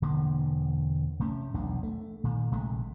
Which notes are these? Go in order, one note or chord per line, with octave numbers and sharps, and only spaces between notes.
E1 D3 A#3
C3 A3 C#4
E1 B1 D4
A3
A#2 D#3
A#1 C3 G#3 A3